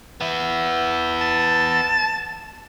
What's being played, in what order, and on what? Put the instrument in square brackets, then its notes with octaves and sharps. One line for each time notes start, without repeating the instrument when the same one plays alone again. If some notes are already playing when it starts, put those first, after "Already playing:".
[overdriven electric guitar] B3 E4
[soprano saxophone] A5